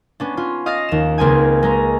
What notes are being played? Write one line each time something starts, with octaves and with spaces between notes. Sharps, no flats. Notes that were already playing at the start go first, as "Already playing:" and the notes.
B3 C#4 D4
C#4 F4
D#5 F5 F6 A6 A#6
D#2 E7
C#2 A#3 C4 D#5 G#5 G#6
G#3 C#4 A#5